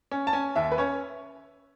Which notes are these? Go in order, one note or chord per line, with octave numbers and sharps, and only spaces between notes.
C#4
A5
C#4 G#5
D#2 E5
B4
C#4 C#5